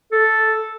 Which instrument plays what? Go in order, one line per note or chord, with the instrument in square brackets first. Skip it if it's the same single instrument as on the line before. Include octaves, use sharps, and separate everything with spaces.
[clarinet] A4